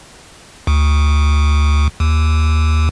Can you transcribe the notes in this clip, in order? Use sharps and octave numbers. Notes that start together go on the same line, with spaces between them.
D2
D#2